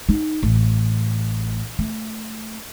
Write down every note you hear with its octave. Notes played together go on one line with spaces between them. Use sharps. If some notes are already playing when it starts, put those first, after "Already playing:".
D#4
A1
A3